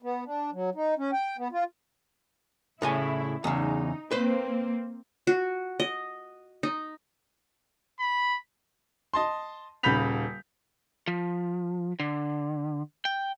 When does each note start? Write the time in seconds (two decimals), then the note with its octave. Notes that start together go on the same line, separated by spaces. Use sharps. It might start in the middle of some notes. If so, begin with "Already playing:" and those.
0.03 B3
0.26 D4
0.53 F#3
0.75 D#4
0.98 C#4
1.13 G5
1.38 B3
1.52 F4
2.82 A2 C#3 E4 G#5
3.44 E2 C#3 D#4
4.11 A#3 C4 B4 C5
5.27 F#4
5.80 D#5
6.63 D#4
8.00 B5
9.14 D#5 A5 C6
9.83 D#1 C#3 B5 G6 B6 F7
11.08 F3
12.00 D3
13.05 G5